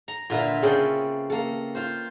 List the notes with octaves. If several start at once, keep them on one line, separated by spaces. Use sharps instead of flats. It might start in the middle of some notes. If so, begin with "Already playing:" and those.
A#5
A#2 D3 F4 B4 E5 A#5
C#3 C4 A4 B4 G5 G#5
A#3 A4
F4 C5